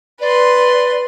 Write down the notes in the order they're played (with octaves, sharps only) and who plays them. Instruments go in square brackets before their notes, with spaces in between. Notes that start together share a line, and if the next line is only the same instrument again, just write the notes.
[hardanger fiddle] B4 C6 [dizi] D5